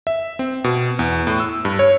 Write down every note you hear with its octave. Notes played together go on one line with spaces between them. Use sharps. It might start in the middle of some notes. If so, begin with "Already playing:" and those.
E5
C4
B2
E2
A2
E6
G2
C#5